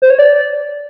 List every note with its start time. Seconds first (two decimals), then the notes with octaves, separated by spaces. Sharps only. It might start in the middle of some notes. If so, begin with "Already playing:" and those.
0.02 C5
0.10 C#5
0.19 D5